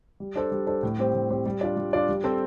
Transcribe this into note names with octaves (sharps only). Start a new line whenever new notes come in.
G3
D4 A4 C5
G3
D4 A4 C5
A2
G3 C4 G4 C5
A2
G3 C4 G4 C5
G3
D4 F4 D5
G3
D4 F4 D5
G3
C4 A4 C5